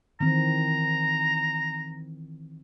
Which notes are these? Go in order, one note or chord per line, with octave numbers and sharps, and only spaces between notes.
D#3 E3 C4 A#5